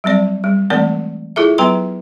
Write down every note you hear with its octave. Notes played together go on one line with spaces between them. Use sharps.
F#3 G3 C4 D5
G3
E3 G#3 A3 C4 A#4 D5
E4 F4 G#4 A4 E5
F#3 B3 B4 G5 A#5 C6